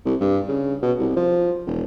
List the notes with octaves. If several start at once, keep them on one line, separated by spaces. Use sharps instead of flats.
C2
G2
C#3
B2
C2
F3
E1